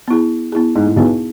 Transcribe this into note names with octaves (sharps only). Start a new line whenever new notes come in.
B3 E4 G#4
B3 E4 G#4
G#2
A2
B1 B2 B3 E4 G#4